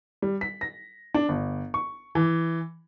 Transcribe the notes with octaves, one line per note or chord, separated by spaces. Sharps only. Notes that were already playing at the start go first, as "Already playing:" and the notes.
G3
B6
A#6
D4
G1
C#6
E3